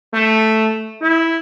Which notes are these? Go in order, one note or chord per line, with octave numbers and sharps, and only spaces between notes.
A3
E4